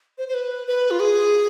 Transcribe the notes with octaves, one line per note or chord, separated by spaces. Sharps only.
C5
C5
B4
B4
F4
G#4